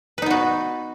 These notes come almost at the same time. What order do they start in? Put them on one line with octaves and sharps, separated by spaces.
B4 D#4 B3 F#4